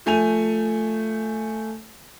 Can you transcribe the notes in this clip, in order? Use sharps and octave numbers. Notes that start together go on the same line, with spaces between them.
F3 A3 G#5 D#7 F7